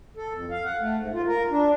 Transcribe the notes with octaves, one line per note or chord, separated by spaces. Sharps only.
A4
F2
F5
F#5
A3
G#2
F4
A#4
D4